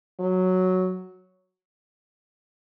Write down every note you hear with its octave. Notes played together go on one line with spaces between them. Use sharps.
F#3